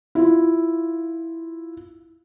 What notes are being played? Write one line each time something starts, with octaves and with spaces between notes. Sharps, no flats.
E4 F4